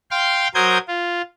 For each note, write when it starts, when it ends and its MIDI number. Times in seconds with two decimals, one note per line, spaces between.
0.11 0.48 77
0.11 0.48 79
0.11 0.48 84
0.11 0.48 89
0.55 0.78 54
0.55 0.78 70
0.55 0.78 72
0.55 0.78 87
0.55 0.78 91
0.55 0.78 92
0.88 1.22 65